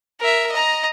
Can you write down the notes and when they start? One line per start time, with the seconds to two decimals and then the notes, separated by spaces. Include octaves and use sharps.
0.20 A#4 E5
0.51 D#5 A#5